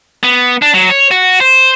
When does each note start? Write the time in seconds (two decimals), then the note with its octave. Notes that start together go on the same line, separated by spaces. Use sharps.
0.23 B3
0.62 D4
0.74 F#3
0.90 C#5
1.11 F#4
1.40 C5